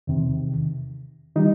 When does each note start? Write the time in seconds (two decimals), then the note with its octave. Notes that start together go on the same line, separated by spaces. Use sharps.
0.07 E2 C3 D#3
1.36 D#3 G3 D#4